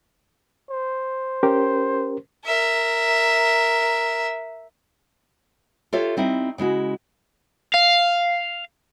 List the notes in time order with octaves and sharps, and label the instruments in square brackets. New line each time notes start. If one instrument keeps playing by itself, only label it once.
[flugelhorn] C5
[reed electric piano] C#4 G4 A#4
[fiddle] A#4 E5
[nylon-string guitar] F4 G4 A4 C#5 E5
G3 C4 D#4 E4
C#3 G#3 E4 F#4
[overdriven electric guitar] F5